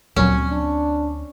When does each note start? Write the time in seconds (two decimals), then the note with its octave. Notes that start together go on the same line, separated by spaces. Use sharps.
0.16 D2 G2 A#2 F#3 C4 C#4
0.50 D4